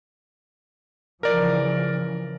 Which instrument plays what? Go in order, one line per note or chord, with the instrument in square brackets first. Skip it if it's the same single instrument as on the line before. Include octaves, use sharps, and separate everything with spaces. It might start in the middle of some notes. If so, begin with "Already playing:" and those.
[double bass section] C#3 E3 F3 [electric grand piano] A#4 D5